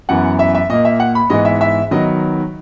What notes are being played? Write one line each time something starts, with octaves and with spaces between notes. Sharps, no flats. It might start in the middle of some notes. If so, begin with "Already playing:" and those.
F#2 E3 B3 F#5
E5
E5
A#2 A#3 D#5
E5
F#5
B5
G#2 E3 B3 D#5
E5
E5
D#3 F#3 B3 D#5